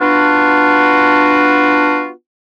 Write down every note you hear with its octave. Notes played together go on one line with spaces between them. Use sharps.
B3 D4 F4 F#4